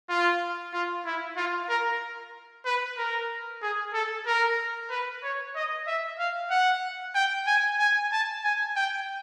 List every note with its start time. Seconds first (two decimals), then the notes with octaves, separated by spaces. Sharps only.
0.09 F4
0.73 F4
1.06 E4
1.37 F4
1.69 A#4
2.65 B4
2.98 A#4
3.62 G#4
3.94 A4
4.27 A#4
4.90 B4
5.23 C#5
5.55 D#5
5.87 E5
6.19 F5
6.51 F#5
7.15 G5
7.47 G#5
7.79 G#5
8.12 A5
8.44 G#5
8.76 G5